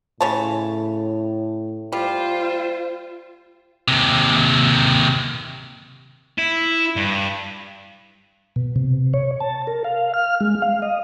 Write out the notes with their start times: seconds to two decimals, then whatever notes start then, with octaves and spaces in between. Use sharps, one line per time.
0.21 A2 C#3 C#5 A5
1.93 G3 F4 C5
3.88 D#2 C3
6.38 E4
6.96 G2
8.56 B2
8.76 C3
9.14 C#5
9.40 A5
9.67 A#4
9.84 F5
10.14 F6
10.40 G#3
10.62 F5
10.82 D#5